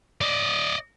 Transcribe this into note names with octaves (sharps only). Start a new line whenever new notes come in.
D5 D#5